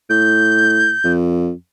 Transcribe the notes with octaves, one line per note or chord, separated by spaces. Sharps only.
A2 G6
F2